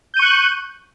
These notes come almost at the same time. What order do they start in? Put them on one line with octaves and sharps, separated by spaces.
G6 D#7 C#6 F#6